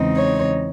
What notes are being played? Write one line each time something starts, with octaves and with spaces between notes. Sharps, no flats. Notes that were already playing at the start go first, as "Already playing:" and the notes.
Already playing: E2 C#3 G#3 C4 D#4
C#5